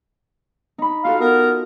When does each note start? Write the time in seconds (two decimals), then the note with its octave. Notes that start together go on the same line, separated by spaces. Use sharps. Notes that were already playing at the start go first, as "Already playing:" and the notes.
0.78 D#4 B5
1.05 F4 F#4 A4 F5
1.20 B3 A#4